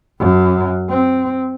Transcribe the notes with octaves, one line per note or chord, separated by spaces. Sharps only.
F#2
C4